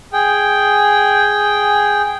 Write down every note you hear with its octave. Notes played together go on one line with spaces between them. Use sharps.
G#4 G5